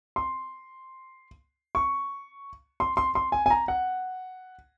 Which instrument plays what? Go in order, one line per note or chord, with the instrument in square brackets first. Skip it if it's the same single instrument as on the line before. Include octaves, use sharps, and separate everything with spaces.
[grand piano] C6
C#6
C6
C6
C6
G#5
G#5
A#5
F#5